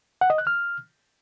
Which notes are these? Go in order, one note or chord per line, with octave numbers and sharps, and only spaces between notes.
F#5
D#5
F#6
F6